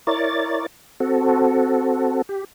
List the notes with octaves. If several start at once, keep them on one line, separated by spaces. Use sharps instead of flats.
E4 A#4 C#5 D5 A6
C4 F#4 A4
G4